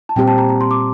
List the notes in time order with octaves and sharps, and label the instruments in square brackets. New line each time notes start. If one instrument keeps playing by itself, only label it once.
[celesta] A5
[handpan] A#2 G3 C4 G4 [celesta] G5
[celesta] A5
A#5
A#5
C6
D6